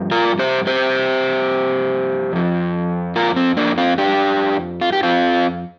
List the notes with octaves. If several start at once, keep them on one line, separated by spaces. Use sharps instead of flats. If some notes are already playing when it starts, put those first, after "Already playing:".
Already playing: G2 F3
F4 A#4
G4 C5
G4 C5
F2 F3
F4 A#4
C4
A#3 D4
C4 F4
D4 G4
F4
G4
C4 F4